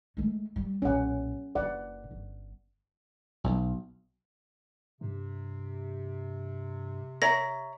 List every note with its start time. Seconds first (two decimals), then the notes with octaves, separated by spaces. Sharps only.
0.17 G#3 A3
0.56 G3
0.82 B1 A#2 C#4 F#5
1.55 F#1 D5 F#5
2.11 G1
3.44 B1
5.01 G2 C3
7.22 C#5 E5 A#5 A#6